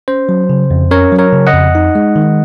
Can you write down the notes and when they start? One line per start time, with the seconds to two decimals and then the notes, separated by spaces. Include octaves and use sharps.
0.08 C#4 C5
0.29 F#3
0.50 C#3
0.71 F2
0.91 C#4 A#4 C#5
1.12 F#3
1.19 A#4 C#5
1.33 C#3
1.47 D#5 F#5
1.54 F2
1.75 D#4
1.95 G#3
2.16 D#3